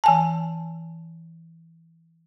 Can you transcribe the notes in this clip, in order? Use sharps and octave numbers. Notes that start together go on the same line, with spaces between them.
E3 G#5 A5